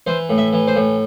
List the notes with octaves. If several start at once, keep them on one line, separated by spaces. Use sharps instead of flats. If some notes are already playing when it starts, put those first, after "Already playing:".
E3 C5
A2
E5
E3
C5
A2